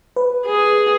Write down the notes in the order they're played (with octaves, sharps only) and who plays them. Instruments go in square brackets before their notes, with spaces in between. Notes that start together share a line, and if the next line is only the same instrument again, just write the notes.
[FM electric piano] B4
[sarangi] G#4